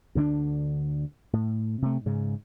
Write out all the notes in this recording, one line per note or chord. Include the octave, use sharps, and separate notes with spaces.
D2 D3 A#3 D4
A2
C3 A3
G#2 C#3